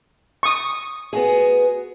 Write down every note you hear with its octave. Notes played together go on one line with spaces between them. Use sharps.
C#6 D#6
B3 F#4 G#4